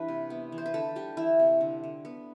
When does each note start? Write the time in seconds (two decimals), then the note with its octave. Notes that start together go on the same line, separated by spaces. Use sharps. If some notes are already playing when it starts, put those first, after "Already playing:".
Already playing: E3 G3 D4 B4
0.08 C3
0.30 B3
0.52 E3
0.58 C5
0.66 B4
0.74 D3 A4
0.96 G3 G4
1.17 E3 E4
1.40 C3
1.61 D3
1.84 D3
2.05 B3